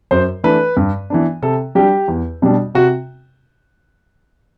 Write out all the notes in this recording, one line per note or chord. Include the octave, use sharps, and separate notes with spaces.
F#2 C5
E3 A3 D4 B4
G2
E3 B3 D4
C3 A4
G3 D4 G4
E2
B2 G3 D4
C3 F#4